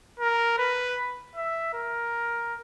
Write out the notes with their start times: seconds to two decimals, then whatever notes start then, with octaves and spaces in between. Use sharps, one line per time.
0.20 A#4
0.58 B4
1.35 E5
1.74 A#4